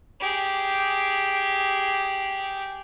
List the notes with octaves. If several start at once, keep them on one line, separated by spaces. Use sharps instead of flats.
G4 G#4